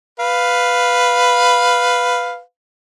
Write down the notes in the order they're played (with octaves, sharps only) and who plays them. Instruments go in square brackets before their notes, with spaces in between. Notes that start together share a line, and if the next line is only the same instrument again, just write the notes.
[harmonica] B4 F5